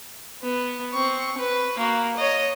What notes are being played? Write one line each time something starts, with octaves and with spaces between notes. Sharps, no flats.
B3
C4 C#6
B4
A#3 F#4
C#5 D#5